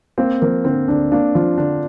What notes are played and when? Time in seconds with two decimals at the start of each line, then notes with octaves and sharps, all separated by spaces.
0.18 A#3 C4
0.41 F3 A#3
0.64 D3 C4
0.88 D2 D4
1.12 A#3 D4
1.35 F3 F4
1.58 D3 D4